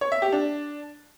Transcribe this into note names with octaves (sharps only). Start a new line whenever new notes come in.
C#5
E5
G4
D4